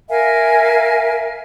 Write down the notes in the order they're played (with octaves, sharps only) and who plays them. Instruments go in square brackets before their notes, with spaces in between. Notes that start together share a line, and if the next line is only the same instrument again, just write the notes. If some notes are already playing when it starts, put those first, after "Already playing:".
[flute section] A#4 E5 F5 G#5